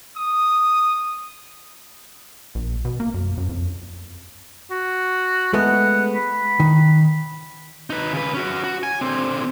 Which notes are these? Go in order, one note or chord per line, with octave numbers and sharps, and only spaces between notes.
D#6
A#1
B2
A#3
F#2
F#2
F2
F#4
G#3 A3 B3 F#5
B5
D#3
D#4 B4
C#3 B4
C#4 F#4
F#4
G#5
D3 C4